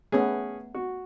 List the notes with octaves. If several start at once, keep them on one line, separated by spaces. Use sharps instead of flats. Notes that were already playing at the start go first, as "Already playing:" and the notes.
A3 B3 C#4 G#4
F#4